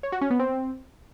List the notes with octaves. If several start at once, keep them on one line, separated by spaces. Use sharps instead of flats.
C#5
F#4
C#4
B3
C4